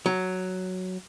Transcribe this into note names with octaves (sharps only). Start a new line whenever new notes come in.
F#3